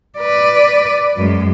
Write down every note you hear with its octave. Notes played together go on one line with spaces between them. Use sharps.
B4 D5
F#2 G#3